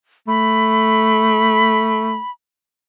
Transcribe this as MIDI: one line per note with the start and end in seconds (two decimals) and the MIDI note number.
0.28 2.19 57
0.28 2.31 83